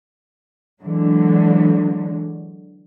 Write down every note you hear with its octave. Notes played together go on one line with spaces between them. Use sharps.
D3 E3 F#3 G#3